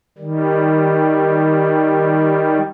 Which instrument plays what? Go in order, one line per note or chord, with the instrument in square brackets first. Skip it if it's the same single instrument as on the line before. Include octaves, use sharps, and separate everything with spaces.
[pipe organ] D#3 G3